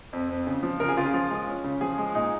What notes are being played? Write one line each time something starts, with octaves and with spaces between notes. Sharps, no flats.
F2
F2
C#3
F3
C#3 A#4
G#4
C#3 F4
G#4
F3 F4
G#3
C#4
C#3
F3 G#4
G#3
A#2 D#4